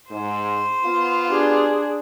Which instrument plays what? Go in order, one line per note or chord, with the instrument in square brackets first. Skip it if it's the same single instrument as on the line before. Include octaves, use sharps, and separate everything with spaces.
[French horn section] G#2 [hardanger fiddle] C5
[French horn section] B3 F4 [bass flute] F5
[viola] D4 G#4 [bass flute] G4